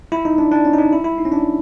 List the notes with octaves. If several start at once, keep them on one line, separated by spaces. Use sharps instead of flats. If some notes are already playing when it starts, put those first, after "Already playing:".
E4
D#4
D4
D4
C#4
D#4
D4
E4
E4
D#4
C#4
D4